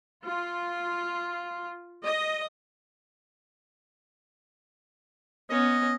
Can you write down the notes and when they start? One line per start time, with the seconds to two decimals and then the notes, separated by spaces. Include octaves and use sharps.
0.24 F4
2.05 D#5
5.50 B3 C#4 D#5